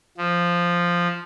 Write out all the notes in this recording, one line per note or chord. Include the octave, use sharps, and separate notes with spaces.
F3